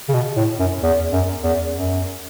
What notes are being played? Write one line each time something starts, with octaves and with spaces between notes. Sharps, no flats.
C#3
B2
A2
F#2
E2
F#2
E2
F#2